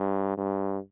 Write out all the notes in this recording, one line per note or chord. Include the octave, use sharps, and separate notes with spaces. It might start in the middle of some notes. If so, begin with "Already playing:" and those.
Already playing: G2
G2